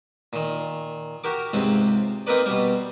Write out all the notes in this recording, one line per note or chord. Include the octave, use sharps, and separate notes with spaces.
A#2 D#3
F#4 G4 A#4 D6
C#2 G#2 C3 C4
A#3 C4 D#4 A#4 B4 D5
B2 G3